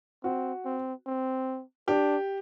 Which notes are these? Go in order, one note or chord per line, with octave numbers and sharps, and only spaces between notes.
C4 F#4
C4
C4
D4 G4